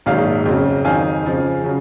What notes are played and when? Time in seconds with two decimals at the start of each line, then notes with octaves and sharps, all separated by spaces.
0.06 A#1 G#2 D#3 F#3 F5
0.45 F2 C#3 F#3
0.85 F2 D#3 F#3 F5 G#5
1.24 F2 C#3 F3
1.64 C#3 F#3